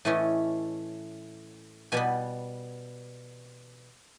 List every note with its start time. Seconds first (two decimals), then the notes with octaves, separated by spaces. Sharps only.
0.05 A2 E3 A3 C#4 D#5
1.92 B2 G3 B3 G#5